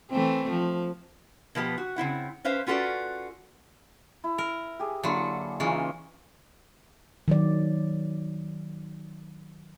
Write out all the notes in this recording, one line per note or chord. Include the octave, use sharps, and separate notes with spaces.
E3 A3 C4
F3
B2 F3 B3 G4
F#4
C#3 C4 E4 F#5
C#4 B4 C5 F5
C#4 F4 F#4 A4 B4 D5
E4
A#4
G4 G#4
D3 F#3 A#3 E4 C6
C#3 E3 C#4 D#4 F4
D#3 F#3 D5